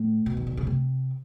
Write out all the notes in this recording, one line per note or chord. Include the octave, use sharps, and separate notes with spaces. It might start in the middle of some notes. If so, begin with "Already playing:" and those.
Already playing: A2
B2
D#3
D3
C#3
C3